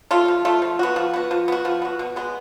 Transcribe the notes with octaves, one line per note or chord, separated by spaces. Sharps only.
A3 F4
F3
A3 F4
F3
B3 F#4
F3
B3 F#4
F3
B3 F#4
F3
B3 F#4
B2
G#3 B3